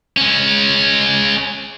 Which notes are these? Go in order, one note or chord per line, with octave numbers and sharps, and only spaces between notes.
G#3 C#4